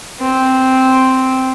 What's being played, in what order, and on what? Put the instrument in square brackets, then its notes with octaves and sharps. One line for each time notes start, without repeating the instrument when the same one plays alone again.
[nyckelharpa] C4